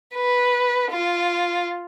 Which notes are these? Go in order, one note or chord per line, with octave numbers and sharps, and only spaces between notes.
B4
F4